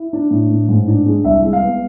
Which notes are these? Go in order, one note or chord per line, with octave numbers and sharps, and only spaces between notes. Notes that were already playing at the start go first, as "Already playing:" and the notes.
Already playing: E4
D4
A2
A2
G#2
D4
G#3
C2 E5
G#3
F5
B3